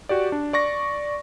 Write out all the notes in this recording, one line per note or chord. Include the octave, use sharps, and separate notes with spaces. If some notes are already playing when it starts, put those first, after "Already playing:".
F#4 G4 D5
D4
D5 C#6 A#6